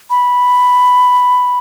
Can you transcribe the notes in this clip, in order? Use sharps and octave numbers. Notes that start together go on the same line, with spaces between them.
B5